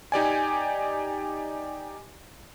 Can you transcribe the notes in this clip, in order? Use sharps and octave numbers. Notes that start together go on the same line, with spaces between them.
D#4 G4 D5 G#5